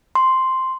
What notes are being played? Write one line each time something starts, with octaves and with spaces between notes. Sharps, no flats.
C6